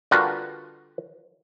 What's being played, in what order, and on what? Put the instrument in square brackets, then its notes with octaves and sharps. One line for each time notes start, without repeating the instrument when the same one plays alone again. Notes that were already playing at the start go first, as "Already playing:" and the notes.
[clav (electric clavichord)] D3 G3 F4 F#4 A#4 B4